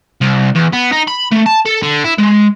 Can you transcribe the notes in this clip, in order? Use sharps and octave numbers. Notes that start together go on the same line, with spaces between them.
C2
E2
B3
D#4
B5
A3
A5
A4
D3
E4
G#3